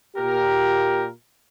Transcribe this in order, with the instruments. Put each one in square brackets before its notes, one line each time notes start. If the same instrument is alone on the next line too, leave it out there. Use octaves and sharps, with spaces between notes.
[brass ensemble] A#2 G4 A#4